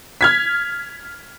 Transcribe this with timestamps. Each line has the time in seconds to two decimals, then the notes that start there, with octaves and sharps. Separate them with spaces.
0.21 F6 G#6 B6